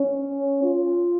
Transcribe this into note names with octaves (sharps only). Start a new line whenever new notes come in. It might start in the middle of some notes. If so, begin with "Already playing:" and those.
Already playing: C#4
F4